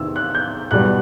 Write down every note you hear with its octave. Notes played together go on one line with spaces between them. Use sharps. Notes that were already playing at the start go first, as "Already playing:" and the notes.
Already playing: E2 C3 D#3 E6
F#6
G6
E2 B2 G3 F#6